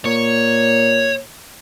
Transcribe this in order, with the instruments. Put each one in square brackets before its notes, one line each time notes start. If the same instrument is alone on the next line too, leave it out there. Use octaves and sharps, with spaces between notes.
[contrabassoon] A#2 [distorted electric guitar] C#5